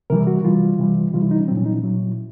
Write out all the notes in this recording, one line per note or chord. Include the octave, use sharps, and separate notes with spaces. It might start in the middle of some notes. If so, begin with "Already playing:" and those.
C3 E3 G3 A#4
F#4
C3 E3 G3 F4
C3 E3 G3
C3 E3 G3 F4
E4
D#4
C#4
A#2 F#3 C4
C#4
D#4
E4
A#2 F#3